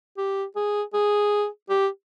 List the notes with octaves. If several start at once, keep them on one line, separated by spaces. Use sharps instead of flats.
G4
G#4
G#4
G4